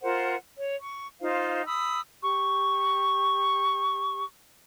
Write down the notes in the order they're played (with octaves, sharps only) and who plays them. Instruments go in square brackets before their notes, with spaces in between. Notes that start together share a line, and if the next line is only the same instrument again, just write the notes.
[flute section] F4 A#4 C5 F#5
C#5
C#6
D#4 F4 C5 F5
B5 D#6 E6
G4 C#6